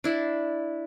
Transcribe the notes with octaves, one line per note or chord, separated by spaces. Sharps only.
D4 E4